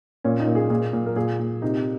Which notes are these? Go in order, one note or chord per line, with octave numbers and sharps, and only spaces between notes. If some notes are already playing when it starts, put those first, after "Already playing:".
A#2 C#4
D#4
A#2
G#4
A#2 G#4
A#2
A#4
A#2 G#4
A#2
C3 D#4